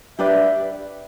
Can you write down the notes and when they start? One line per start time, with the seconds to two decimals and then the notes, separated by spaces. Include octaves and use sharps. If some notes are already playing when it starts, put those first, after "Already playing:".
0.18 D4 G4 B4 D5 E5